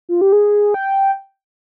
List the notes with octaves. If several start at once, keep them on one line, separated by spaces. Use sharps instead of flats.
F4
G4
G#4
G5